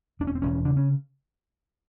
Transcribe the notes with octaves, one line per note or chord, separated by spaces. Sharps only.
E1 D4
C#4
C4
E1 C#4
C#3 D4
C#4